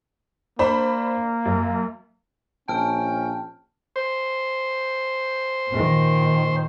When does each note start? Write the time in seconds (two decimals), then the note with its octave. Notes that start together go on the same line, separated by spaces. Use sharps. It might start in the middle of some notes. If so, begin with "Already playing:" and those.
0.59 A#3 D4 C5 B5
1.45 F#2
2.68 A#1 C#4 G5 A5 F6
3.96 C5
5.70 A#2 D#3